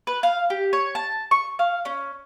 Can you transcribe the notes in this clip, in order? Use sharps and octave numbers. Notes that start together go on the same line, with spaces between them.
B4
F5
G4
C#5
A5
C#6
F5
C#4